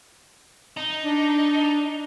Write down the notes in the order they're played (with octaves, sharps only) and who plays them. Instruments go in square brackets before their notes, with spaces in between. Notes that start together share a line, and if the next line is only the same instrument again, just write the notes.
[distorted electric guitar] D#4
[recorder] D4